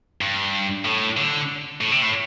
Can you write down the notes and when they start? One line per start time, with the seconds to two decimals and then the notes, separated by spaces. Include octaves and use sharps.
0.21 G2
0.85 A2
1.17 D3
1.81 A2
1.92 C3
2.02 A2